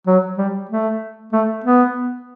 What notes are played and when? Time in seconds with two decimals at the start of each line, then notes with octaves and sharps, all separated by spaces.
0.07 F#3
0.38 G3
0.69 A3
1.32 A3
1.64 B3